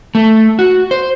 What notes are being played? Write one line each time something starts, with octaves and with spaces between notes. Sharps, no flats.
A3
F#4
C5